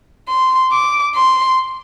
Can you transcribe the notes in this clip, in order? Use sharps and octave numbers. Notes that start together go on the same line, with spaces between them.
C6
D6
C6